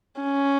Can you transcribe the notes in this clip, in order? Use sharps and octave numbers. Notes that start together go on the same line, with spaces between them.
C#4